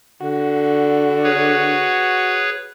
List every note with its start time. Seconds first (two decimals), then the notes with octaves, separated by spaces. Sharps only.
0.22 D3 F#4
1.24 G#4 B4 C#5